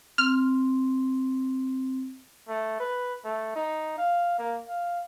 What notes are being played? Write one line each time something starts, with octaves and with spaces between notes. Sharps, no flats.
C4 F6
A3
B4
A3
D#4
F5
A#3
F5